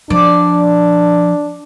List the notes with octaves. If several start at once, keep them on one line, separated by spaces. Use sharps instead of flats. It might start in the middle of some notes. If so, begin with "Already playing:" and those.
F3 D4 D5